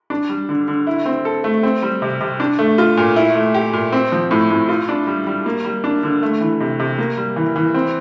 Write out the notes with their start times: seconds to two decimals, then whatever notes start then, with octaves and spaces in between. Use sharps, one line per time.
0.10 D4
0.29 G3
0.49 D3
0.68 D3
0.87 E4
1.06 C4
1.25 A4
1.44 A3
1.63 C4
1.82 G3
2.02 C3
2.21 C3
2.40 D4
2.59 A3
2.78 F4
2.97 A#2
3.16 E4
3.35 A3
3.54 G4
3.73 A#2
3.92 C4
4.12 F3
4.31 A2
4.50 A2
4.69 F4
4.89 D4
5.07 G3
5.27 G3
5.46 A#3
5.65 G3
5.84 D4
6.03 D3
6.23 A3
6.41 E3
6.60 C3
6.80 C3
6.98 A#3
7.17 G3
7.36 E3
7.56 E3
7.74 C4